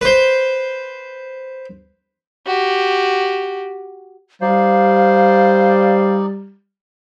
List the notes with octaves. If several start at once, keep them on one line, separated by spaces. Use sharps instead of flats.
B4 C5
F#4 G4
G3 D#4 C5 D5 F5